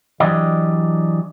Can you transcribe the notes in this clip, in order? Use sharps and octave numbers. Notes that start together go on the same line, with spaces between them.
E3 F#3 D4 G4 D5 D#5